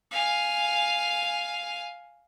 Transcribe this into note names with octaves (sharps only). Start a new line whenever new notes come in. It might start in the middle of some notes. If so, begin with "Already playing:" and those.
F5 G#5